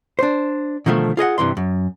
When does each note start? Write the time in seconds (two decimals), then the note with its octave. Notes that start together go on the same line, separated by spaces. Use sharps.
0.19 D4 C5
0.86 B2 D3 D#3 F3 A3
1.17 F4 G#4 D#5 F#5
1.38 G2 C3 E3 C6
1.57 F#2